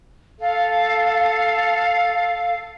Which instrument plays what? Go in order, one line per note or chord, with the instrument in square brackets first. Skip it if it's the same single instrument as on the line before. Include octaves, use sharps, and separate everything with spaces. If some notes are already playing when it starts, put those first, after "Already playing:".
[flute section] A4 F5